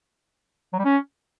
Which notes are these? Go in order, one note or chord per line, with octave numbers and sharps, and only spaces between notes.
F#3
G3
C#4